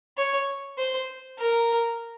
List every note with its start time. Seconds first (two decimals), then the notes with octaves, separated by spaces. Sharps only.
0.17 C#5
0.78 C5
1.39 A#4